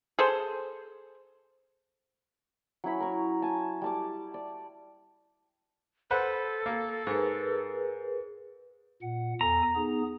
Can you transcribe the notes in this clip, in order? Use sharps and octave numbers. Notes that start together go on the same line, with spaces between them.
G#4 A4 C5
F#3 C#4 E4 B5
A#4 C#6
G#5 A5
G3 A5 D6
D5
A4 B4 C5 F#5
A#3
G#2 G#4 A#4 B4
A#2 F#5
E2 A4 G#5 A#5
B3 D#4 G#4